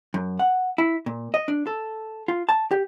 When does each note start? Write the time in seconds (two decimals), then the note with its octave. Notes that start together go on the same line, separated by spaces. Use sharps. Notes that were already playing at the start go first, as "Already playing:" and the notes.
0.14 F#2
0.39 F#5
0.78 E4
1.06 A#2
1.34 D#5
1.48 D4
1.67 A4
2.28 F4
2.49 A5
2.71 G4